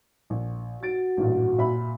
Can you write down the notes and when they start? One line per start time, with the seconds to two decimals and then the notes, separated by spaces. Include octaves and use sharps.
0.30 A#1
0.83 F#4 A6 D7
1.17 A1 G2 A#2
1.58 A#2 E5 B5